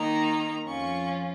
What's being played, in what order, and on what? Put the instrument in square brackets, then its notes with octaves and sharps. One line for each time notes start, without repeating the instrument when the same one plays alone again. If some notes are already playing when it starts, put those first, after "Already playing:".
Already playing: [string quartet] D#3 A#3 D#4 A#5
F2 F3 C#4 F4 C#6